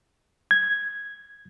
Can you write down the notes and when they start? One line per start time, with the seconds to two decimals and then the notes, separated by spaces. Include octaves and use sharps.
0.51 G#6